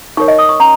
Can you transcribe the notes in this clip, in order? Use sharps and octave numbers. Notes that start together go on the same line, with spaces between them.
D#4 A#4 C#5 C#6
D#5
D#6
C#6
C#4 A#5